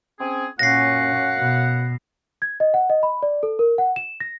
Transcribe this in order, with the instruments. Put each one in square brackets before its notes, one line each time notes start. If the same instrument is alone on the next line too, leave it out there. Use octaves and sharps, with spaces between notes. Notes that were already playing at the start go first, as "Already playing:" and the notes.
[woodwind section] C4 C#4 G#4
[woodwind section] F#2 F5 F#5 [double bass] A#2 C#4 [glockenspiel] A#6 C7
[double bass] B2
[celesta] G#6
D#5
F#5
D#5
B5
D5
A4
A#4
F#5
E7
A#6